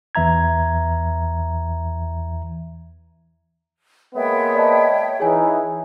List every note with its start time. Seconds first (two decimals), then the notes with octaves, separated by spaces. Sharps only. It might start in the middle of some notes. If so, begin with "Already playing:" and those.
0.15 E2 E3 E5 A#5 G#6
4.14 G#3 A#3 B3 C#5 E5 G5
4.54 D5 D#5 A5
5.20 E3 D#4 G#4 C#5 G#5